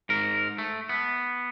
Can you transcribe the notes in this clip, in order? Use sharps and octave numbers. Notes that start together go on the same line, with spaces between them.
G#2 A#4
A3
B3